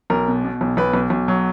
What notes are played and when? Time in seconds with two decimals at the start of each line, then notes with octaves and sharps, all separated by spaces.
0.10 B1 A#4
0.28 B2
0.44 B2
0.61 B1
0.77 B1 B4
0.93 B1
1.10 B1
1.28 F#3